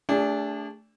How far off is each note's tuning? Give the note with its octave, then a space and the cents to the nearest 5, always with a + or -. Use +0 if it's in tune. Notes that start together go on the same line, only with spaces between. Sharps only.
A3 +0 D4 -20 G#4 -45